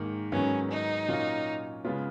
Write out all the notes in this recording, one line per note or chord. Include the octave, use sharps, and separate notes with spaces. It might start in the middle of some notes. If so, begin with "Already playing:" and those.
Already playing: G#2 D#3 A#3
G#2 D#3 F#3 B3 C#4
D#4
A#2 F#3 C#4 F4
C#3 G#3 B3 F4